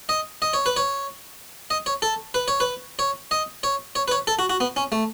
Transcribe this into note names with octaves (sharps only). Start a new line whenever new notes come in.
D#5
D#5
C#5
B4
C#5
D#5
C#5
A4
B4
C#5
B4
C#5
D#5
C#5
C#5
B4
C#5
A4
F#4
F#4
B3
C#4
A3